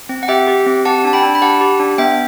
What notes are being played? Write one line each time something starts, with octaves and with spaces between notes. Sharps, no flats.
C4
F#5
G4 E5 G5
G4
C4
G4 F#5 A5
D4 A5
G5 B5
D4
B5
G4 F#5 A5
G4
D4
B3 E5 G5